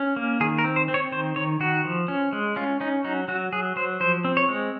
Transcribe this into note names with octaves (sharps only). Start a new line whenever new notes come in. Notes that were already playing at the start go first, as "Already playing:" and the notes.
Already playing: C#4
A#3
D#3 G#4
A#4
C4
C5
C4
C#5
D#3 C5
D#3 C#5
D#3 F#4
F3
C#4
G#3
C#4 F4
C#4 D#4
F#3 D#4
F#3 F#4
F#3 G#4
F#3 C5
F3 C5
C4
C#5
G#3